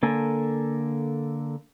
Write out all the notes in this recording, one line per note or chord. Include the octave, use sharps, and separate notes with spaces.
D3 A#3 A4 A#4 G#5